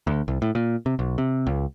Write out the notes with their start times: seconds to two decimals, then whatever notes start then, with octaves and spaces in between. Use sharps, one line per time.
0.07 D2
0.28 C2
0.42 A2
0.55 A#2
0.86 C3
0.99 B1
1.18 C3
1.47 C#2